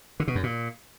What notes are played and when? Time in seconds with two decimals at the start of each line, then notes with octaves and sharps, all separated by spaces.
0.20 D3
0.28 B2
0.35 F#2
0.43 A#2